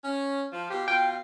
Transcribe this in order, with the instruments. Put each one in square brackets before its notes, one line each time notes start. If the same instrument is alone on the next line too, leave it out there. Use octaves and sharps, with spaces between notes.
[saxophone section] C#4
F3
B2 F4 G4
[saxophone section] B2 F4 [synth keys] G5